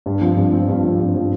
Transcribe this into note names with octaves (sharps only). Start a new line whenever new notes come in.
G2
F3 C4
G2
F3 C4
G2
F3 C4
G2
F3 C4